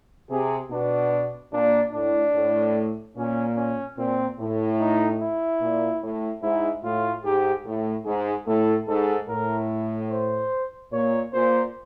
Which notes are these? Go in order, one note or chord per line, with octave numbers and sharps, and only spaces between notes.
C3 G#4
B2 D4
A#2 D4
A2 D4
A2
A#2 C#4
C#4
A#2 C4
A2
D#4
E4
A#2
A2
G#2 E4
A2 F4
G#2 G4
A2
G#2 G#4
A2 A4
G#2 A4
A2 A#4
C5
A#2 C#5
A#2 C5